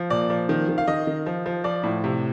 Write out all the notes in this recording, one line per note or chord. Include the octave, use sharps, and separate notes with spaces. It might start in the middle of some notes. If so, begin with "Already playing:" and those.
Already playing: F3
A#2 D5
F3
D#3
D#3
F5
D#3 D#5
D#3
F3
F3
F3 D5
A2
C3